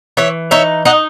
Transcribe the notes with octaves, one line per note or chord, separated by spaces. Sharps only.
E3 C#5 E5
D#4 C#5 E5
D#4 D#5 F#5